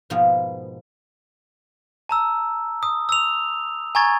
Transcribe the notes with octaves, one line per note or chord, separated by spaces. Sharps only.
G#2 B2 F3 G#3 A#3 B3
A5 A#5 E6
D#6
E6 F7
G#5 A#5 C#6 G#6 A6